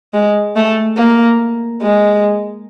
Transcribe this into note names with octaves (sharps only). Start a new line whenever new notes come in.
G#3
A3
A#3
G#3